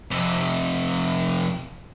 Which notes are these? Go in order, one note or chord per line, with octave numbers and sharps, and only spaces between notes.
F2 C3